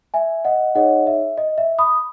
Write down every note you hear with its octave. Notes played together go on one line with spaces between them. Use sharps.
E5 G#5
D#5 F#5
D#4 G#4 C#5 D#5 F#5
E5
D#5
E5
B5 D#6